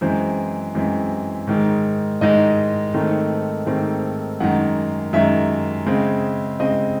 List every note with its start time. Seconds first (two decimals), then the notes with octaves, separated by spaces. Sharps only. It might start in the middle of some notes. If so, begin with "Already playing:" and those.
0.01 F#2 E3 G#3 C4 C5
0.75 F#2 E3 G#3 C4
1.47 G#2 D#3 G#3
2.21 G#2 D#3 G#3 D#5
2.94 G#2 D#3 A3 C4
3.66 G#2 D#3 A3 C4
4.40 F#2 D#3 G#3 F#5
5.13 F#2 D#3 G#3 E5
5.86 C#3 G#3 C4
6.60 C#3 G#3 C4 D#5